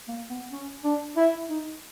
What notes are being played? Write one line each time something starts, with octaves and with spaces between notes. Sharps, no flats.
A#3
B3
C#4
D4
E4
D#4